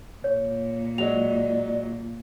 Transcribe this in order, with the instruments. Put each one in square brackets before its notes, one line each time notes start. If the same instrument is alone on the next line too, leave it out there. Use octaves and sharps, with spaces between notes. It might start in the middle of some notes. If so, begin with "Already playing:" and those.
[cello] A#2 [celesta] C#5
[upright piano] F#3 G#3 [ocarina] D5 [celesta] F7